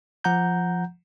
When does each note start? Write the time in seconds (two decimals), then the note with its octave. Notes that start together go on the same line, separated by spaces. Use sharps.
0.24 F3 F#5 A#5 G6